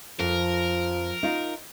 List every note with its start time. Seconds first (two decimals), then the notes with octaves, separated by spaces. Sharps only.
0.19 F2 F3 A#4
1.23 D#4 F4